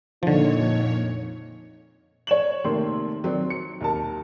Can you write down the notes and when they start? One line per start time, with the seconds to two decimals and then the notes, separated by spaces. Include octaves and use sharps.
0.23 F2 A#2 D3 F3 D#4 C#5
2.27 C#5 E7 F#7
2.64 C3 D#3 A3 A#3 C4 C6
3.24 D#3 F#3 C4 D5
3.50 C#7
3.81 D#2 A#4 A5